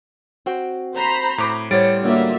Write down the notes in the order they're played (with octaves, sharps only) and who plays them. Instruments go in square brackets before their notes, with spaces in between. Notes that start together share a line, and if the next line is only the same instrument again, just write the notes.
[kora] C4 F#4 G5
[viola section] C5 A#5 B5
[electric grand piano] A2 D6
[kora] A2 B3 C#5 [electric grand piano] G3 A6 D7 [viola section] C5
[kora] D3 F#4 D5 [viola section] A#3 F4 E5